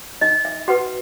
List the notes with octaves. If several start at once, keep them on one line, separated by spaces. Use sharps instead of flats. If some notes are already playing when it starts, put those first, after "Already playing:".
D#4 D#5
E5
F#4 B4 F#5